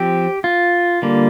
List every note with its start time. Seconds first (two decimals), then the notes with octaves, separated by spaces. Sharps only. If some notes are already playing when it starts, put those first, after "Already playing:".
Already playing: F3 C4 G4
0.44 F4
1.02 D3 G3 A#3